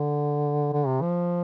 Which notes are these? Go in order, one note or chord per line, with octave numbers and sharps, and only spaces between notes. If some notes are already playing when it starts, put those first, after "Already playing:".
Already playing: D3
D3
C3
F3